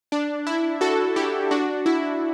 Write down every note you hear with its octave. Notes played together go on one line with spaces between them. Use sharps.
D4
E4
F#4 A4
E4 G4
D4 F#4
E4